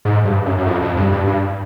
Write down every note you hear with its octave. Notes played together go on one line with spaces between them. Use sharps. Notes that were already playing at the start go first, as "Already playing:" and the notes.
G#2
G2
F#2
F#2
F2
F2
G2
G2
G2